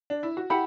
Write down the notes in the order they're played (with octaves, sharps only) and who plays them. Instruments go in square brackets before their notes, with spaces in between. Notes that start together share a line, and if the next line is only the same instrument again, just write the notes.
[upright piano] D4
E4
F#4
[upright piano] E4 G4 [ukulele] F#5 B5